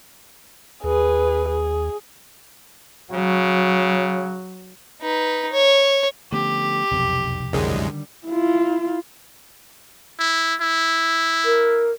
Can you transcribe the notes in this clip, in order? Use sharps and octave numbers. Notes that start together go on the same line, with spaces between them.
D#2 G#4 B4
G#4
C#3 F#3
D#4 B4
C#5
D3 F3 A3 B3 C#4 G4
E1 B1 F2 C3
C2 F#2 D3 D#3 G3 G#3
E4 F4
E4
E4
A#4